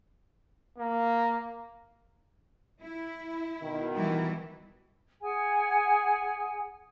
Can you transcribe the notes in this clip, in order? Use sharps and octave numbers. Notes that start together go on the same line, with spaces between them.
A#3
E4
B2 D#3
E3 G3 E4
G#4 F#5 G#5